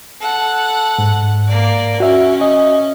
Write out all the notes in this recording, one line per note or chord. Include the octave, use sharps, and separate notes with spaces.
A4 F#5
G#2
A#3 D5
C#4 F#4 E5
D#5